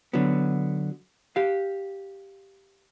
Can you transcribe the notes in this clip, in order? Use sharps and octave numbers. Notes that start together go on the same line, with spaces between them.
D3 F#3 B3
G4 F5